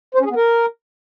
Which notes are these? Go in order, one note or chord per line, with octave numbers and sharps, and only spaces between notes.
C5
C#4
G#4
B3
A#4